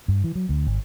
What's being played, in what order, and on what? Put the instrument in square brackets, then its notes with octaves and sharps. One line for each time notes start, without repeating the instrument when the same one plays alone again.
[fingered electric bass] G2
E3
F#3
D2
G#1